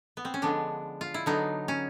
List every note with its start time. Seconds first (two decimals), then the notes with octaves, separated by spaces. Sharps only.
0.17 B3
0.25 C4
0.34 C#4
0.42 D3 F3 G#3 B3 D4
1.01 F4
1.14 E4
1.26 D3 F#3 B3 D#4
1.68 C#4